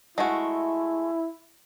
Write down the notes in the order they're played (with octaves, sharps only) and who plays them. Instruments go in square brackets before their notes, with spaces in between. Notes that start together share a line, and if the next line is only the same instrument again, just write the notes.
[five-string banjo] G#3 A3 F#4 [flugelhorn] E4